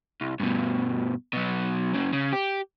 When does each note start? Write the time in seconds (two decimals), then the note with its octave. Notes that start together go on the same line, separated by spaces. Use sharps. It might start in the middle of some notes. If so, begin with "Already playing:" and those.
0.21 C2
0.40 G2 B2
1.33 B2 F#3
1.94 F#2 C#3
2.13 C#3
2.33 G4